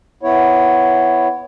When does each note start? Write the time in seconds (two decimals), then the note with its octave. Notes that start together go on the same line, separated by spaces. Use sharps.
0.23 B3 E4 C#5